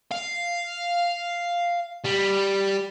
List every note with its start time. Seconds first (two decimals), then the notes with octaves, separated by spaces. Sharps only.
0.11 F5
2.05 G3